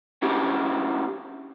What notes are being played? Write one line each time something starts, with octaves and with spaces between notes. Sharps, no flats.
B3 C#4 D4 E4 G4